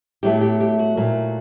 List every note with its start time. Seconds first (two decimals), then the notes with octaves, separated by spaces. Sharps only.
0.23 A2 F#3 A3 G4
0.41 G4
0.60 G4
0.79 F#4
0.97 A#2 F#3 A3